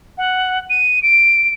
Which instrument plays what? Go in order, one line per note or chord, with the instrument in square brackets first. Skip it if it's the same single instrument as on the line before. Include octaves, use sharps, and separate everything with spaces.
[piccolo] F#5
D#7
D7